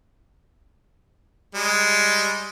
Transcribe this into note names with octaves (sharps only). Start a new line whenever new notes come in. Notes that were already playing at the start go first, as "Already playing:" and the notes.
G3 G#3